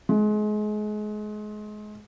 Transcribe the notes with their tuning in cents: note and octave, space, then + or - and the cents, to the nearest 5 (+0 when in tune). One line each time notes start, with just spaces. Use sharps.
G#3 +30